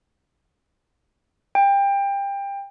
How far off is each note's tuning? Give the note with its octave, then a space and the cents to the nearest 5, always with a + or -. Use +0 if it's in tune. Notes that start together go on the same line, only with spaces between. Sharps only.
G5 +25